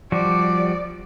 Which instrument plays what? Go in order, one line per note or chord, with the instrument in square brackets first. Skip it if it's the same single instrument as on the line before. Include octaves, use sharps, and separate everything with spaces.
[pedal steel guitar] F3 G3 F#4 [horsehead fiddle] D5